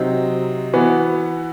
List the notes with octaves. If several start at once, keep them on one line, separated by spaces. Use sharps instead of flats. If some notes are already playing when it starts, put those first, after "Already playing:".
Already playing: C3 F#3 C4 D#4
E3 B3 F#4